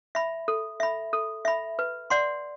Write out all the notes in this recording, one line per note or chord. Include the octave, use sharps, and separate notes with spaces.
E5 B5
A4
E5 B5
A4
E5 B5
B4
D5 F#5 C6